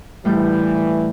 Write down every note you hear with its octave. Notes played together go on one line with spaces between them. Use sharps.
A2 E3 G3 G6